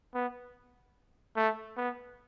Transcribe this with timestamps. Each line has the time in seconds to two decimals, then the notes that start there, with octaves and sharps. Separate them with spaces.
0.15 B3
1.36 A3
1.77 B3